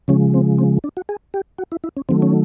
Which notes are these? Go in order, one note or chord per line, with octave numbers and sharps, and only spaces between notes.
C#3 F3 G#3 C#4
C4
C4
D4
F#4
G#4
G4
F#4
E4
E4
C#4
D#3 F#3 A3 C4
C#4